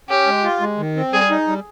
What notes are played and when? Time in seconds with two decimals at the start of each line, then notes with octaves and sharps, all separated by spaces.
0.09 C#4 G4
0.27 G#3
0.44 F4
0.61 G#3
0.78 D#3
0.96 C4
1.13 G3 G#4
1.30 D#4
1.48 G3